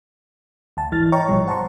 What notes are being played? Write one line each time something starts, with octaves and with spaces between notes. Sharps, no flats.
D2 A5
A1 G#2 E3 E4 F6 A6
C#5 D#5 G5 A#5 C#6
A1 G2 B2 F3 G3
C5 F#5 A5 A#5 C6 C#6